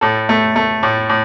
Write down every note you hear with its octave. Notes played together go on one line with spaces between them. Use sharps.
A2 A4
A3
A3
A2
A2